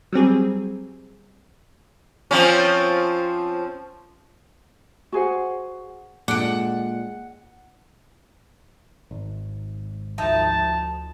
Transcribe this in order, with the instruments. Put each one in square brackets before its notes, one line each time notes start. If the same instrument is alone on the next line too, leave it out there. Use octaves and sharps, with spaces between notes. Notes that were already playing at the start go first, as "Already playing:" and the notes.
[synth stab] F#3 G3 C4 G#4
[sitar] F3 C4 C#4
[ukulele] F#4 G#4 C5 F#5
[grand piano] A#2 [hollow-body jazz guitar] G#3 D4 A4 [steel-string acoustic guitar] F#5 [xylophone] D6 F#6 D7
[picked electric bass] G#1
[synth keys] D2 F3 [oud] D#4 E5 [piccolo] A5